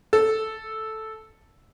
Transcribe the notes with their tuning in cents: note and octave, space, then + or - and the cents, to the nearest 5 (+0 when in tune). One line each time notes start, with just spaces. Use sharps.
A4 -5